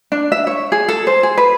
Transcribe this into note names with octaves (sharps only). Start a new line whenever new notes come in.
D4
E5
C#5
G#4
A4
C5
G#4
B4